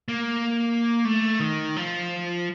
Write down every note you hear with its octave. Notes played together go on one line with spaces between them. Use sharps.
A#3
A3
D#3
F3